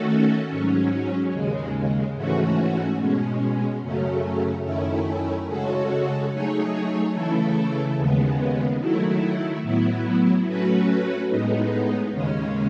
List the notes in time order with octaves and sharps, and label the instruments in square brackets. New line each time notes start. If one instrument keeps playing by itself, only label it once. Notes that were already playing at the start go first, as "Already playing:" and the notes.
Already playing: [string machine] D#3 A3 C#4 F#4 A4
G#2 F#3 C#4
D#2 C#3 G#3
G#2 E3 A3 C#4 F#4
B2 G#3 C#4
F#2 C#3 F#3 A3 C#4
F#2 D#3 A3 C#4 E4
C#3 G#3 C#4 F#4 A4
F#3 A3 D#4 G#4 C#5
C#3 E3 A3 E4 A4
D#2 C#3 G#3 B3
D#3 F#3 A3 E4
A2 F#3 B3 E4
F#3 A3 C#4 F#4 B4
A2 G#3 B3 D#4
D#2 C#3 G#3 C#4